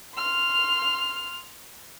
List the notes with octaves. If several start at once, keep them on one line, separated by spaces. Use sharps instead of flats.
C6 F6